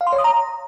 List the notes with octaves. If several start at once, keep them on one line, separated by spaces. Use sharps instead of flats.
F5
C6
C#5
D#6
A#5